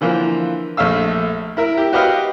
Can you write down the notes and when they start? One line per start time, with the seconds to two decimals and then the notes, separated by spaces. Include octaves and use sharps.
0.01 D3 E3 F3 A#3
0.77 A#1 A3 E5 F5 E6
1.57 E4 A#4 E5
1.77 G4
1.93 F#4 G4 B4 D#5 F5 F#5